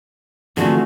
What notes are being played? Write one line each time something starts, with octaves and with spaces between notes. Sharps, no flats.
D3 E3 F3 A3 C4 F#4 G#4